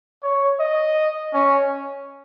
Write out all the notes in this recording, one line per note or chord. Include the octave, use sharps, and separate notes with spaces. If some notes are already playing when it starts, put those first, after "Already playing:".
C#5
D#5
C#4